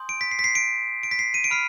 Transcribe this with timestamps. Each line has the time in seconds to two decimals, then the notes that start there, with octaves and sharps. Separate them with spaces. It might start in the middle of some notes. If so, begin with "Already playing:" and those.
Already playing: G#5 C6 D#6 G6
0.09 D7
0.21 B6
0.31 C7
0.39 B6
0.44 C7
0.55 D7
1.03 D7
1.11 B6
1.19 C7
1.34 D#7
1.44 D7
1.51 B5 F6 C7